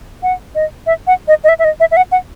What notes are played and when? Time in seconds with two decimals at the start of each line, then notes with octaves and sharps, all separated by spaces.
0.23 F#5
0.55 D#5
0.87 E5
1.07 F#5
1.28 D#5
1.44 D#5
1.49 E5
1.59 E5
1.64 D#5
1.80 E5
1.91 E5
1.97 F#5
2.12 F#5